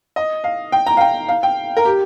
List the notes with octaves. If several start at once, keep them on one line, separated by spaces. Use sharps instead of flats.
D#5
F5
G5
A#5
F5
G5
F5
G5
A#4
G4